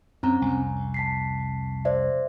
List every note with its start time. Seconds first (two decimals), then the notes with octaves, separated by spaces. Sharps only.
0.23 F#2 C4 C#4 A#5
0.42 C2 F2 G#5
0.94 A5 B6 C7
1.85 C5 D5 E5